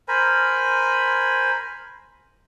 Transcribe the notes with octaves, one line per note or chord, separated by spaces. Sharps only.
A#4 C5 G#5 B5